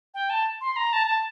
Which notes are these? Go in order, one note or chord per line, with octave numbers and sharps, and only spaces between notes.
G5
A5
C6
A#5
A5
A5